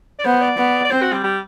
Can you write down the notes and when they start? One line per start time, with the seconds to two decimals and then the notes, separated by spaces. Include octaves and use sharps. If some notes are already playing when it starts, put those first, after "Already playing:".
0.19 D5
0.25 B3 C5
0.41 D5
0.58 B3
0.85 D5
0.91 C4 C5
1.02 F#4
1.13 G3
1.24 G3